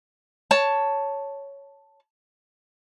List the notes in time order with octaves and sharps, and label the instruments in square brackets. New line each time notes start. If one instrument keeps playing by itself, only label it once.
[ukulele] C#5 A5